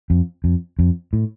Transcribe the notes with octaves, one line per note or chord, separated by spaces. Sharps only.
F2
F2
F2
A2